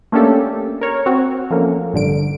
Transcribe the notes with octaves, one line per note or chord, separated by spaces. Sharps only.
A3 A#3 C#4 D4 G4 A4
A#4 C#5
C4 F#4
F3 A3 A#3 C#4
A1 G2 D3 D7